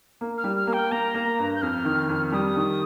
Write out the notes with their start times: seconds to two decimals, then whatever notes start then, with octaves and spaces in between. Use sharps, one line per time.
0.21 A#3
0.38 F6
0.44 G3
0.57 F6
0.67 A#3
0.73 G5
0.92 A#3 A#5
1.14 A#3
1.39 G2
1.55 G6
1.62 F2 F6
1.85 D#3
2.09 F2
2.27 F6
2.32 G3 D#6
2.57 D#3